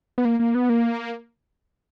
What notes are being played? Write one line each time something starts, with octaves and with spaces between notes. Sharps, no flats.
B3
A#3
A#3
B3
A#3